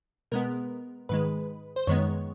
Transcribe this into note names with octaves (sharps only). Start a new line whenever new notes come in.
B2 G#3 B3 A#4
G#2 D#3 G#3 B4
C5
F#2 D#3 G#3 B3 C#5